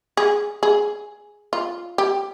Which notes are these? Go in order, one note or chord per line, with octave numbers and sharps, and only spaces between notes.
G#4
G#4
F4
G4